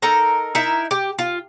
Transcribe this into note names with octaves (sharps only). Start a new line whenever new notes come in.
D#4 A4 A#4 A#5
D#4 E4 A#4 E5
G4
F4